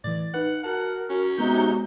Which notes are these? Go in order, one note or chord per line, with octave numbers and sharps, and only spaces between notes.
A2 E3 D5
D#4 B4 F#5
F#4 A#4 F#5 A5
C#4 F#4
C3 G#3 B3 D#4 F#4 G6